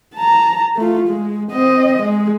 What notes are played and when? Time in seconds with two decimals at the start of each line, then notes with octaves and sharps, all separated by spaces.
0.14 A5 A#5
0.77 A3 F4
1.08 G#3
1.52 C4 D#5
2.03 G#3